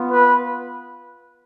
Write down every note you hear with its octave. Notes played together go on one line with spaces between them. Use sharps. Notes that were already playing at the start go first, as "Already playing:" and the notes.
Already playing: B3 F4
B4